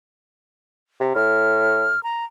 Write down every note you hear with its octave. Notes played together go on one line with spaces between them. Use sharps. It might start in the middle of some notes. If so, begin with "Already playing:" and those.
C3
A2 F6
A#5